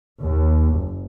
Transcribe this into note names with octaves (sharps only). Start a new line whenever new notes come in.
D#2
F#1